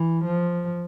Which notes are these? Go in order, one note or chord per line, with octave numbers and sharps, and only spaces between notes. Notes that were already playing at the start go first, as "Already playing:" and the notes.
Already playing: E3
F3